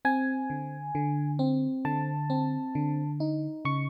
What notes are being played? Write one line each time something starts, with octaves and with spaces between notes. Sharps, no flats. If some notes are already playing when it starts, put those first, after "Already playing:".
C4 G#5
D3
D3
C4
D3 A5
C4
D3
D#4
C#3 C#6